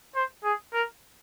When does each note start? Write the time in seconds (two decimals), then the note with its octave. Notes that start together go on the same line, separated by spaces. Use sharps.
0.15 C5
0.44 G#4
0.73 A#4